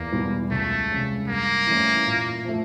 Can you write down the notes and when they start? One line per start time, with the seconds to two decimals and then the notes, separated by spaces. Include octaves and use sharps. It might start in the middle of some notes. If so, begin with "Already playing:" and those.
Already playing: E2 A#3
0.12 B2 G3 B3
0.51 C#2 A3
0.90 C3 E3 G#3 C#4
1.28 G2 A#3
1.67 E3 A3 C#4
2.06 A#2
2.44 F3 A3